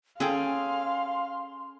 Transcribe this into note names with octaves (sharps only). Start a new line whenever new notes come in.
C#4 G#4 A4 F5 G5 C6